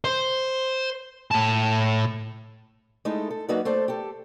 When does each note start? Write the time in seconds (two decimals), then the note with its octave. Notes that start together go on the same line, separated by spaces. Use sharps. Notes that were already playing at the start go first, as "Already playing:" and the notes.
0.05 C5
1.32 A2 A5
3.05 G#3 A3 D#4 E4 A4
3.30 A4
3.48 F#3 A#3 D#4 F#4 B4 D5
3.65 A3 A4 C5 D5
3.88 G4 A4